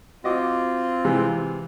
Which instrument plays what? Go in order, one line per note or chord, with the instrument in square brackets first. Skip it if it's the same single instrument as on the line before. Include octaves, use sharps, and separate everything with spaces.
[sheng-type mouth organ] C4 F4 [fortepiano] F#4 D#5 D6
[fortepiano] C3 E3 G#3